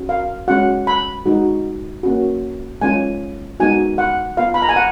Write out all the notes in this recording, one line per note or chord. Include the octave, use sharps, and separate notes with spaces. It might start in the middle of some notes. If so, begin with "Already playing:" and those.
Already playing: C#4 F#4
F5
G#3 C#4 F#4 F#5
B5
G#3 D#4 F#4
A#3 C#4 F#4
G#3 C#4 F4 G#5
G#3 B3 D#4 F#4 G#5
F#5
B3 F4 F5
B5
A#5
G#5
F#5